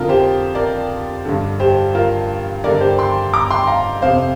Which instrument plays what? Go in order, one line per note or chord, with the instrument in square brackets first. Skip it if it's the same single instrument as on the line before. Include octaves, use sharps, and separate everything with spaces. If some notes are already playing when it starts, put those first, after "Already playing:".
Already playing: [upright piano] F2 D3 F4 A#4
G4 C5
A#4 D5
G2 D3
G4 C5
F4 A#4
G2 D3 A#4 D5
G4 C5
G5 C6
A#5 D6
G5 C6
F5 A#5
F2 C3 C5 F5